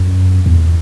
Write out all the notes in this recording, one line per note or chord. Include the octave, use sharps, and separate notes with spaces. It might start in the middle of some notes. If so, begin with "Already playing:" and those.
Already playing: F#2
E2